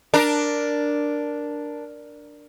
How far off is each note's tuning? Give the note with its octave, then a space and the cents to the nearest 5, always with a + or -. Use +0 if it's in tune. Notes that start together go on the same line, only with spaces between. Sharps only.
D4 +0 A#4 +5